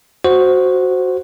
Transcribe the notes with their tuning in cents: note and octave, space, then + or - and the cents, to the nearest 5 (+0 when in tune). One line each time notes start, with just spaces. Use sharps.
F#4 +0 C5 +0